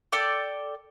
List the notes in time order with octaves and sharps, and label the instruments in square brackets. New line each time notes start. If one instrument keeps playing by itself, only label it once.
[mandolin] A4 D5 G5 D6